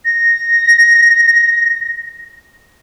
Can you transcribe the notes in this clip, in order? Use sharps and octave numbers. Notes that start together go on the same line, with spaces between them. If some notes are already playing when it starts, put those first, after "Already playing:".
A#6